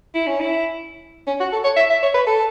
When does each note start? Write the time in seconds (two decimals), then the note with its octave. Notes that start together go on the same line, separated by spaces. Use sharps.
0.15 E4
0.27 C#4
0.40 E4
1.27 C#4
1.40 F#4
1.52 A4
1.64 C#5
1.77 E5
1.90 E5
2.02 C#5
2.14 B4
2.27 A4